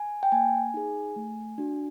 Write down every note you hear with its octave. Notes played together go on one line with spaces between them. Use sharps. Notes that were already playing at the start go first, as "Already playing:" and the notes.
Already playing: G#5
G5
A#3 G#5
D#4 G#4
A3
D4 F#4